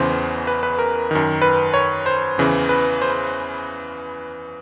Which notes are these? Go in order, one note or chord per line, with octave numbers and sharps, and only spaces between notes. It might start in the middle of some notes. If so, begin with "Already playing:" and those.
Already playing: E2 C#3 E3 C5
B4
B4
A#4
F#2 D#3
B4
C#5
C5
E2 C#3 E3
B4
C5